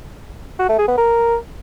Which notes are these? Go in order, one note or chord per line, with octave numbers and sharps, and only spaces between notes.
F#4
A3
G#4
B3
A#4